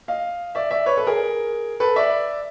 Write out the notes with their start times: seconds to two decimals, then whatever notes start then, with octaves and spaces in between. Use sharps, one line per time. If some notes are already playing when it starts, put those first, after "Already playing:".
0.08 D#5 F5
0.55 D5 E5
0.71 D5 E5
0.86 B4 C#5
0.97 A4 B4
1.07 G#4 A#4
1.80 A4 B4
1.96 D5 E5